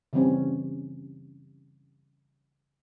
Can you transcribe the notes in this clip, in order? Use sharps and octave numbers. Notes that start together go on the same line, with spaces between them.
C#3 E3 G3 C4 C#4